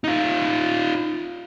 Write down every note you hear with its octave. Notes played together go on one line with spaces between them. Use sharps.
D#4 F4